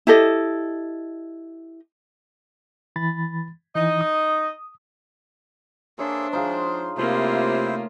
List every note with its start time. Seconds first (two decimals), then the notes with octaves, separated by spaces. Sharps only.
0.07 E4 G4 A4 D#5
2.96 E3 B5 A6
3.76 E3 D#4 D#5
4.01 D#6
5.99 A#3 D4 G#4 A4 C5 C#5 E5
6.33 F3 D#4 F4 F#4 G#4 C5
6.97 C3 A3 A#3 E4 F4 C5